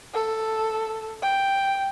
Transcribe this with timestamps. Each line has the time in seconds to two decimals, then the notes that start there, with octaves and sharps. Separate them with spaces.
0.14 A4
1.22 G5